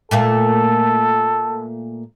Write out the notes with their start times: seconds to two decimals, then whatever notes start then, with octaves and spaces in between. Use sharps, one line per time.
0.11 A#2 A3 A#3 A4